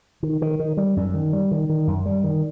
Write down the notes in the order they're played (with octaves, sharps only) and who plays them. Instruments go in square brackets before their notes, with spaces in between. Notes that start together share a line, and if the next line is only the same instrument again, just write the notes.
[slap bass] D#3
D#3
D#3
G3
F#2
D#3
G3
D#3
D#3
F#2
G3
D#3